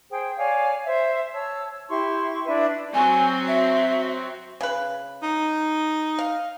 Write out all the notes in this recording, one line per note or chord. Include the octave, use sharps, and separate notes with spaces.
G#4 C5 G5
C#5 D5 F5 G#5
C5 E5
C#5 A5 E6
E4 G4 C6 C#6
D4 E4 B4 E5
F#3 C4 F#4 G#5
E5
C#3 B4
D#4
F5